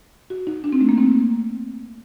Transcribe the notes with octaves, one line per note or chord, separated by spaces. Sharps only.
F#4
D#4
D4
C4
A3
A#3
C4